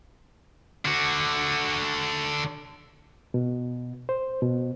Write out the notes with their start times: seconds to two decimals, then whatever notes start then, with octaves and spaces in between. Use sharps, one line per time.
0.85 D3 F#4
3.34 B2
4.09 C5
4.42 B2